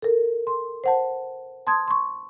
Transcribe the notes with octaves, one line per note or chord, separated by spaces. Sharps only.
A4 A#4
C6
C5 F#5 A5
A5 C6 D#6 G#6
C6 C#6